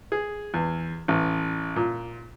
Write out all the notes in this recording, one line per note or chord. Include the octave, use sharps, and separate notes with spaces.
G#4
E2
A1
A#2